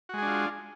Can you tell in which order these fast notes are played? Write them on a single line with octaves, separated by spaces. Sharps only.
F#4 G#3 G#4 D4 F4